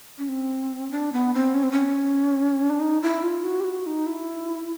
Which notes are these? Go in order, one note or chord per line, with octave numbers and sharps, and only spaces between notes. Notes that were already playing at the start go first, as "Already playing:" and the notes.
C#4
C4
D4
B3
C4
C#4
C4
C#4
D4
D#4
E4
F4
F#4
G4
F#4
D#4
E4